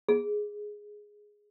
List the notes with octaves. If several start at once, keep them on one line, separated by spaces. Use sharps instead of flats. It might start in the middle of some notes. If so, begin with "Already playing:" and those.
G#4